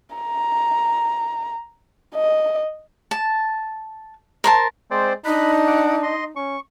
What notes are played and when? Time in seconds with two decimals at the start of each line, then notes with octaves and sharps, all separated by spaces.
0.16 A#5
2.15 D#5
3.11 A5
4.44 A#4 C5 A5
4.91 G#3 C4 C5 D5
5.25 D4 D#4 B5 F#6
5.67 F#5 D6
6.03 D#5 C6
6.36 C#4 C#6